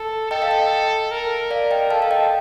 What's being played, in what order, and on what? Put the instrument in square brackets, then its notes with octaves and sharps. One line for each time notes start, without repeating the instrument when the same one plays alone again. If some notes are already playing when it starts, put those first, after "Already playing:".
Already playing: [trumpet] A4
[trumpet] A4 [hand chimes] D#5 G5
[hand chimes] F5
D#5 G5
[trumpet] A#4
[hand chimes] D5 F5
D#5 G5
[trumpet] A4 [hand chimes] F5 A5
[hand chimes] F5
D#5 G5